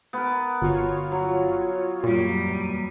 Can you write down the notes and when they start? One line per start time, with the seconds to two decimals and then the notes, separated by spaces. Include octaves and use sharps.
0.13 B3 A#4
0.61 G1 F4 F#4 C#5
1.12 F#3
2.04 F#2 A#2 G3
2.46 E2 D#7